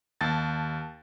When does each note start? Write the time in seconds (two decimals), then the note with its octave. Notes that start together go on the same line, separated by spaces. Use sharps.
0.21 D#2 A5 A6